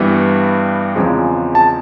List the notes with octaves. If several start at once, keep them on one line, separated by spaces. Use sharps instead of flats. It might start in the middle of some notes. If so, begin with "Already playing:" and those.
Already playing: G2 E3 G3 B3
E2 C#3 F3 G#3 C4
A5